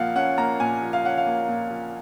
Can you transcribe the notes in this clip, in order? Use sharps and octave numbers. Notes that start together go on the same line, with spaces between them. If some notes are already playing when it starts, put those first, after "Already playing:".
Already playing: A#2 F3 A#3 F5 F#5
C#4 F#5
A#3 A#5
A#2 G#5
F3
F5
C#4 F#5
F5
A#3
A#2
F3